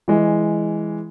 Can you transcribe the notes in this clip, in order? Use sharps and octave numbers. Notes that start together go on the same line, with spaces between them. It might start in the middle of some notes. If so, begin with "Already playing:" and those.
E3 G#3